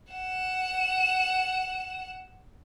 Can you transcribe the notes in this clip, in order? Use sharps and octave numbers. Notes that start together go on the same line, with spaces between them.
F#5 E7